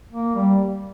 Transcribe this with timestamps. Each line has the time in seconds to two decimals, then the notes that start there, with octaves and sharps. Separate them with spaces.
0.13 A#3
0.35 G3